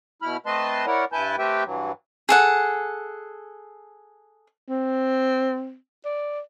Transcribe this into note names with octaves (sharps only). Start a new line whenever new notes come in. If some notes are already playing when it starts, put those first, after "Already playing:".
B2 E4 B5 F6
A3 C4 B4 D#5 A5 C6
E4 A#4 C#5 D5 F#5
G2 E4 B4 G#5 A5 G6
A3 C4 G4 B4 E5 G5
G2 E3 F#3
G#4 A4 F#5
C4
D5